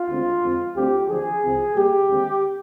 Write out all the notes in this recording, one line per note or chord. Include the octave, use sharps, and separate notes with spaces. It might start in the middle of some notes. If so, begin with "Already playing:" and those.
Already playing: F4
D2 D3 G#3 C4
F2 D3 G#3 C4
D2 D3 G3 C4 G4
D#2 D3 F3 G#4
C2 C3 F3 C4
A#2 G3 A#3 G4
D#2 D3 G#3 C4